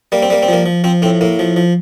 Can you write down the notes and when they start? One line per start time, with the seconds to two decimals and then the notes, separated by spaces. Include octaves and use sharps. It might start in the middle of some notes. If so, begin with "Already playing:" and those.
0.12 G3 A#3
0.22 C4
0.30 G3 A#3
0.43 C4
0.48 F3 A#3
0.66 F3
0.84 F3 C4
1.02 A2 C4
1.21 A2 A#3
1.39 F3
1.56 F3